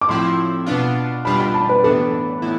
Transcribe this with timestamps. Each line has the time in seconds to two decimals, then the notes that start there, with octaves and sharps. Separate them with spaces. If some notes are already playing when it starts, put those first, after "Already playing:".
0.01 D6
0.09 A2 F3 C4 E4 C6
0.66 B2 B3 D4 F4
1.25 B2 G3 D4 F4 B5
1.40 B5
1.54 A5
1.69 B4
1.84 A2 E3 B3 D4 A4
2.42 A2 E3 B3 E4